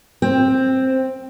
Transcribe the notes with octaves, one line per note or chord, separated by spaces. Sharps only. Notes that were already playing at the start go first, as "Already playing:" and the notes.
C4